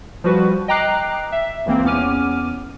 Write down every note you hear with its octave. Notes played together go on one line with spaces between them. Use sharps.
F3 G3 F#4 B4
D#5 G5 A#5 D6 F#6 C7
E5
C#2 E3 A#3 C4
E2 B3 C#4 D6 F6 D#7